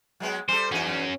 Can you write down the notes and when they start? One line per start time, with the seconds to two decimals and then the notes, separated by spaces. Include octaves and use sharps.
0.20 F#3 G#3 B3
0.49 G3 A4 C5
0.71 E2 C#4 D#4 F#4